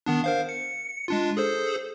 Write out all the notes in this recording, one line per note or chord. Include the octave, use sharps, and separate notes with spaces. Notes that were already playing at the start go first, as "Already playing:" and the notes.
D#3 B3 D4
A#4 C5 F5
C#7
G#3 D4 F4
G#4 A4 C5